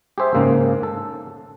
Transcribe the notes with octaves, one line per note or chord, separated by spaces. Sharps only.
G4 G#4 C5 E5
G#2 C#3 A#3
A4